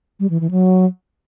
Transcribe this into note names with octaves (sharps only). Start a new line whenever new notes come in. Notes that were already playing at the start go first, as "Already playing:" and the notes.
G3
E3
E3
F#3